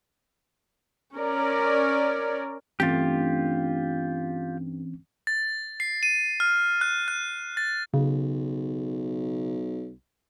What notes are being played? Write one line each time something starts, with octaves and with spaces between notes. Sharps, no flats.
C#4 A#4 D5
G2 E3 A3 C4 C#4 F4 G4
A6
C7
D#7
F6
F#6
F#6
A6
B1 C#3